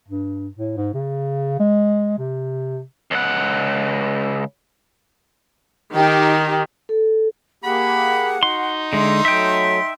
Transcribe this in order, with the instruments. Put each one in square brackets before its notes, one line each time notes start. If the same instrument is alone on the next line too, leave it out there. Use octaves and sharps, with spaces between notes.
[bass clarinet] G2
A2
G#2
C#3
G#3
C3
[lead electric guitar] C#2 F#5
[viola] D#3 [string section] D#4 G4
[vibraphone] A4
[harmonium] A#3 G4 G#4 [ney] F#5 [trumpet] B5
[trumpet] D#4 [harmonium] F#4 [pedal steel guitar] C6
[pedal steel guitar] D3 G#3 [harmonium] E5 [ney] C6
[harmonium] F#3 A3 [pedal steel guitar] E5 G5